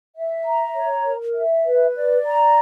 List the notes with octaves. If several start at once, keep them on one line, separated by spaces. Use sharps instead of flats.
E5
A#5
C#5
A#4
E5
B4
D5
A#5